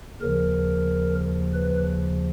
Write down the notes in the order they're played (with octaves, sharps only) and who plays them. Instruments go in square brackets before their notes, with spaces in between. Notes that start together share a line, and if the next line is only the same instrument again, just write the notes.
[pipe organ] D#2 C#3 F3 A#4
B4